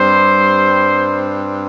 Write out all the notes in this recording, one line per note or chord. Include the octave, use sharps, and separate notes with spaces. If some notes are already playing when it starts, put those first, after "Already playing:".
Already playing: G2 G3 C4 C5